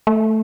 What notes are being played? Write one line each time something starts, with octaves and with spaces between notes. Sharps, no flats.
A3